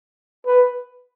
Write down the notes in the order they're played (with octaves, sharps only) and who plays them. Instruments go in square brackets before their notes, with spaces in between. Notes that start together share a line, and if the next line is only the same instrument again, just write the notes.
[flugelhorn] B4